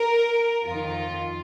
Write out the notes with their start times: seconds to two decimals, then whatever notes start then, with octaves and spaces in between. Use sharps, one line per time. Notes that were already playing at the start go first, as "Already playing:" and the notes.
Already playing: A#4
0.65 F2 D#3 F4